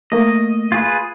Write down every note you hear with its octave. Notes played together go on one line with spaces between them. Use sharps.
A3 A#3 D#5
F4 G#4 B4